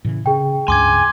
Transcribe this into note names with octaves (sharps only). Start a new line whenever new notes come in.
A2 C#3 E3
C#3 G#4 G5
C#2 G2 G#5 C6 D6 G#6